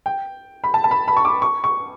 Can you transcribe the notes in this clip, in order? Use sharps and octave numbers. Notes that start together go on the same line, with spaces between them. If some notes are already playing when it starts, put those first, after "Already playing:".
G5
B5
A5
A5
B5
B5
C#6
D6
C#6
C#6